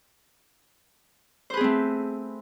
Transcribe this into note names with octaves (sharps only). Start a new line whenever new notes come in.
A3 C4 G#4 B4 C5